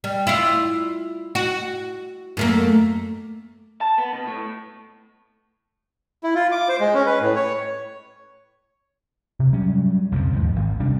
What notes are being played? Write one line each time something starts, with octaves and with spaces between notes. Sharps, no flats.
G3
E4 F4
F#4
F#2 A3 A#3
A5
B3
B2
A2
E4
F4
D6
C5
G#3
C#4
B4
A2
C#5
C3
F#3 G3 C#4
B1 F2 C#3 F3
D#2 G#2 F3
G#1
C3 G3 C#4 D4